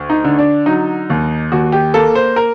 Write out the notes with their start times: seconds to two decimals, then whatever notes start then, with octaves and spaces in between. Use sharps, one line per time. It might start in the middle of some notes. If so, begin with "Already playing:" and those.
Already playing: D2
0.10 D#4
0.24 D3
0.39 D4
0.66 F#3 D#4
1.10 D#2
1.52 D#2 F#4
1.72 G4
1.94 A#3 A4
2.15 C5
2.36 A#4